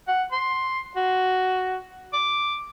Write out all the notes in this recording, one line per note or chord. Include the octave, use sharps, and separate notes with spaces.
F#5
C6
F#4
D6